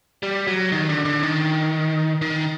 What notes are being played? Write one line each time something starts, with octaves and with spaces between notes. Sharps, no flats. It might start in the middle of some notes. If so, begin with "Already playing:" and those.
G3
F#3
D#3
D3
D3
D#3
D#3